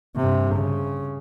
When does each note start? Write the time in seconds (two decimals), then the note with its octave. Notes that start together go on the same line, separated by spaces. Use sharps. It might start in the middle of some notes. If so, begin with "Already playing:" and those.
0.16 G2 C3
0.55 C#3